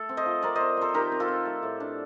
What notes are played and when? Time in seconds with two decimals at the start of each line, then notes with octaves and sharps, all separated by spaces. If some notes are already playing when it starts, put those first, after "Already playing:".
Already playing: A3 A4
0.09 C4
0.17 C5 D#5
0.26 F3
0.42 C4 A#4 D5
0.55 C4 C5 D#5
0.77 C4 A4 C5
0.94 D#3 G4 A#4
1.12 C4
1.20 F4 A4
1.28 C4
1.45 A3
1.63 A2
1.80 D4